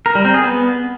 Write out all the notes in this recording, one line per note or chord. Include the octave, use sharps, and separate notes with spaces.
A#4
G3
C4
G#4
B3